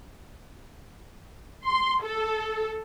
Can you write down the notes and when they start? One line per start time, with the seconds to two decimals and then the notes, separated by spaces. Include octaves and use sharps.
1.64 C6
2.01 A4